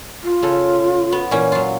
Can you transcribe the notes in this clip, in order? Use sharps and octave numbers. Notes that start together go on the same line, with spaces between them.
F4
C#3 A4
B3
A#2 E3 C#4
F#3 F4